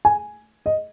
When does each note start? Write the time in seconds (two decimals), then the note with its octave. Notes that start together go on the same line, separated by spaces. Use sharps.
0.05 G#5
0.66 D#5